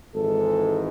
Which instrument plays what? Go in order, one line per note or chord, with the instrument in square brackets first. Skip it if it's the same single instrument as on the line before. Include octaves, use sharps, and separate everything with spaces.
[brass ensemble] G#1 G#2 E3 G#3 A4